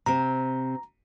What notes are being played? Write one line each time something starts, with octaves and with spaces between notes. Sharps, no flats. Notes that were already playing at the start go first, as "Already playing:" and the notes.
C3 C4 A#5